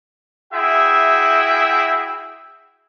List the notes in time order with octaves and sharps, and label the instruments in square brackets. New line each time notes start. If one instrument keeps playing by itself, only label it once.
[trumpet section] E4 F#4 G#4 E5 G5